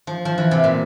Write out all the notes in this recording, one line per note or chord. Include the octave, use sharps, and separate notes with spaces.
F3
F3
E3
C3
A#2